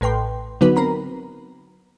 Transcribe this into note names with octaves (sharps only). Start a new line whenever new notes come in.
A1 A2 B4 G5 C6
D3 F#3 B3 D#4 F#4 B4
C4 A#4 A#5 B5